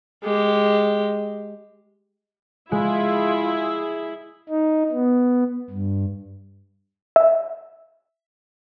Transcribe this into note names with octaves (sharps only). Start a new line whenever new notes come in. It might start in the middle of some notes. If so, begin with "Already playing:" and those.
G#3 G4
G#3 E4 F4 G#4
D#4
B3
G2
E5